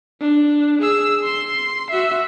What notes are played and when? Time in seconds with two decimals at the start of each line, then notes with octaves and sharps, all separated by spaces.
0.21 D4
0.81 G#4 E6
1.23 C6
1.90 F#4 E5